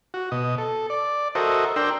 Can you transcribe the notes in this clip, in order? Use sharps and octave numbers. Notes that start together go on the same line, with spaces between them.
F#4
B2 D#5
A4
D5
F#4 A4 A#4 C5 D#5 E5
D4 A#4 G5 C6 E6